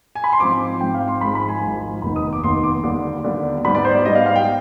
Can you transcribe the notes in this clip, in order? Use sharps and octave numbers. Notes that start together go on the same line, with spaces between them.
G#5
B5
C6
G#2 F3 C4 D6
G#2 F3 C4 G5
F5
C6
G#1 G#2 F3 G#3 B5
B5
G#5
G#1 G#2 F3 G#3
F1 D#2 D#3 B3 D#4 B5
D#6
D6
F1 D#2 D#3 B3 D#4 C6
D6
D#2 D3 G3 B3 D4
D#2 D3 G3 B3 D4
G#2 G3 B3 B5
D5
C5
D5
G#2 G3 B3 D#5
F5
F5
G5